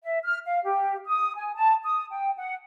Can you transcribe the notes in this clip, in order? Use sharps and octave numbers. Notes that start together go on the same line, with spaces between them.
E5
F6
F5
G4
D#6
G#5
A5
D#6
G5
F#5